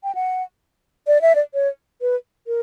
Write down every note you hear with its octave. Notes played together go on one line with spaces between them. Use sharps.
G5
F#5
D5
E5
D5
C#5
B4
A#4